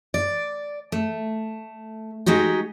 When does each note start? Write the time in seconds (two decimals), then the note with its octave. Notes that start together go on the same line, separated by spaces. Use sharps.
0.14 D5
0.92 A3
2.26 G#3 D#4 F#4 G4